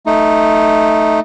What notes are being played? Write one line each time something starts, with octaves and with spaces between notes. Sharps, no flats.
A3 D#4